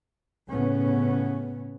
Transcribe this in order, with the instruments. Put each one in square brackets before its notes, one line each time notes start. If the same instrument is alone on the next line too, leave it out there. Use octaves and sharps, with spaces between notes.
[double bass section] A2 C#3 B3 C#4